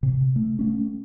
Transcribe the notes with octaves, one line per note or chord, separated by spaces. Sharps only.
C3
A3
A3 C#4